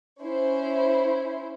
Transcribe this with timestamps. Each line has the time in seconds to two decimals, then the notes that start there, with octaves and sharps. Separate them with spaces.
0.21 C#4 E4 C5